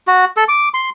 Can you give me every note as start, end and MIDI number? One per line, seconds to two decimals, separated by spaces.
0.07 0.25 66
0.37 0.44 69
0.48 0.69 86
0.74 0.90 84